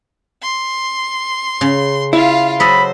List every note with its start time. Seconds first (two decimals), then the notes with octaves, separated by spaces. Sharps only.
0.42 C6
1.61 C#3
2.13 E4 F4 F5
2.60 F#3 A4 C5 D#5 B5